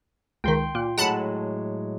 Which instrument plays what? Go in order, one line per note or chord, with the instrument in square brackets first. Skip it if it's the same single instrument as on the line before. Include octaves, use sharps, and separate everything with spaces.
[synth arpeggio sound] C#2 D#3 [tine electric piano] G5 C6
[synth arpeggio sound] A#2
[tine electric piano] A2 F#3 G#3 [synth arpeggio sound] F#5 A5 B5